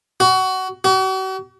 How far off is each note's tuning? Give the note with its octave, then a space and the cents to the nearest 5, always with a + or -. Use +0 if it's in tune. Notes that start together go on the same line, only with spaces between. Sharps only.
F#4 +20
F#4 +40